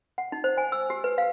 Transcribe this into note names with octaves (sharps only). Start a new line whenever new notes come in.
F#5
D#4
C5
G#5
E6
G4
B4
F5